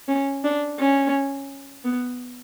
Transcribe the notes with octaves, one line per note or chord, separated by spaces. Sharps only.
C#4
D4
C#4
B3